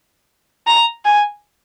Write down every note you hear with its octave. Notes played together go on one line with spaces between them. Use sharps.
A#5
G#5